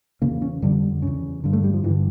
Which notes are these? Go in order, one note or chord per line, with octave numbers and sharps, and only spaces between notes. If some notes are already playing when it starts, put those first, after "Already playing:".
E2 C#3 A#3
C#4
F2 D3 G3
E2 C#3
G2 D3
A3
G3
F3
G2 D3 E3